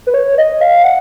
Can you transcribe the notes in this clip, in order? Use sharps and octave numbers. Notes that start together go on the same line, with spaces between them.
B4
C#5
D#5
F5
F#5